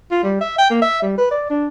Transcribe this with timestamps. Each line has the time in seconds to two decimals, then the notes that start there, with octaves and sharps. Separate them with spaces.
0.11 F4
0.23 G3
0.41 E5
0.58 G5
0.70 A#3
0.82 E5
1.02 G3
1.18 B4
1.31 D5
1.50 D4